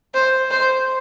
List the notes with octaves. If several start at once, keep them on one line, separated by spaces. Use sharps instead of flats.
C5
C5